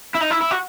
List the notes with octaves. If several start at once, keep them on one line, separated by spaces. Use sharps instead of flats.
E4
D#4
E4
E4
F#4